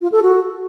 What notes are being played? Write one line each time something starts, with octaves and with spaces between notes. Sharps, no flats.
F4
A4
F#4